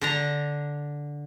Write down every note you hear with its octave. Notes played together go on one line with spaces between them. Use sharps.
D3 D4 A#5